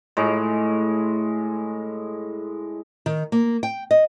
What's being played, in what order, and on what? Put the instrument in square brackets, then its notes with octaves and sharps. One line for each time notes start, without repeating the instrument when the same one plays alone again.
[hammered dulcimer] A2 G#3
[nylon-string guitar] D#3
A#3
G5
D#5